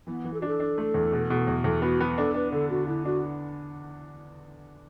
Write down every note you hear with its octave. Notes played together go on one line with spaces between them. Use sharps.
E3 B3
E3
A4
D4 F#4
A4
D4
A3
E2
B2
B2
E2
E2 A4
B3 F#4
B3
D4 A4
D4 B4
D3 A4
D3 F#4
D3 E4
D4 F#4